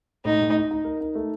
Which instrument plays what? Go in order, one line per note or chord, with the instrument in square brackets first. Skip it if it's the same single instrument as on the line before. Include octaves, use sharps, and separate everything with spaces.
[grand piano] A2 [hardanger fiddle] D#4
[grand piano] A2
D#4
D#4
A#4
D#4
A3